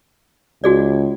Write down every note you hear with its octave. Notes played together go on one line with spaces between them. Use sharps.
C#2 F#4 G#4 D5